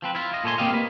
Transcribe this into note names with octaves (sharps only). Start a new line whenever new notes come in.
F3 C4 B4
E4 F4
F4 D#5
A#2 A4 C#5 G#5 C6
G3 A#3 C4 G4 D#5 F5
A#3 B4